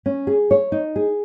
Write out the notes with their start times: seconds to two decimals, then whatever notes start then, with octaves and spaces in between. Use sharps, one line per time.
0.06 C#4
0.27 G#4
0.51 C#5
0.72 D#4
0.96 G#4